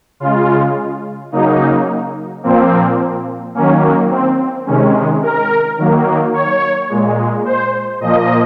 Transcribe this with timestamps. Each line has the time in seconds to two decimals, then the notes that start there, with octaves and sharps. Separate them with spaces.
0.20 C#3 G#3 F4
1.32 C#3 F#3 A#3 D#4
2.43 A#2 F3 A#3 C4
3.55 D#3 F#3 A#3 C#4
4.10 C4
4.66 C3 D#3 G#3 C#4
5.22 A#4
5.78 D#3 F#3 A#3
6.34 C#5
6.89 A#2 G#3
7.45 C5
8.01 A#2 F3 A#3 D#5